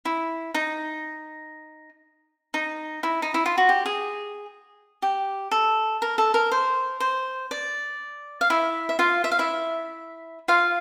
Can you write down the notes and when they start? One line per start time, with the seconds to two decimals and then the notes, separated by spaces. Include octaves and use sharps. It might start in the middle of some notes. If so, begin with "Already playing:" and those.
0.05 E4
0.54 D#4
2.54 D#4
3.03 E4
3.22 D#4
3.34 E4
3.46 F4
3.58 F#4
3.69 G4
3.86 G#4
5.02 G4
5.51 A4
6.02 A#4
6.18 A4
6.34 A#4
6.51 C5
7.00 C5
7.51 D5
8.41 F5
8.50 E4 E5
8.89 E5
8.99 F4 F5
9.24 E5
9.31 F5
9.39 E4 E5
10.48 F4 F5